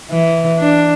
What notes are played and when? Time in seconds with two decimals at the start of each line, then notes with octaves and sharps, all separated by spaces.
0.11 E3
0.59 D4